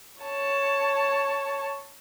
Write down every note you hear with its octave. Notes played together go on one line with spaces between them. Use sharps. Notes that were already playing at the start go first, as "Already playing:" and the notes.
C#5 A5